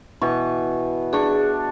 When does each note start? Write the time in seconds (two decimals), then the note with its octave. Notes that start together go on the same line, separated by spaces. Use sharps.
0.21 B2 E3 C#6
1.13 D4 G#4 C#6